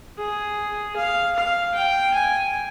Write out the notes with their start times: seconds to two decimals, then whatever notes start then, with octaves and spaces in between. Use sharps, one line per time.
0.19 G#4
0.96 F5
1.36 F5
1.74 G5
2.14 G#5